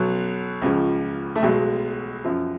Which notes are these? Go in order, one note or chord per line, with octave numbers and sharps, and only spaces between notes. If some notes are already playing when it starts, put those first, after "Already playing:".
Already playing: B1 B2 F#3
C#2 C#3 F3
A3
B1 B2 F#3 G#3
F#2 F3